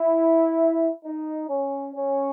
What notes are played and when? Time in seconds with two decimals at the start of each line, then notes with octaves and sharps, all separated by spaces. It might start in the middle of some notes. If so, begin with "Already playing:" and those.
Already playing: E4
1.05 D#4
1.49 C#4
1.95 C#4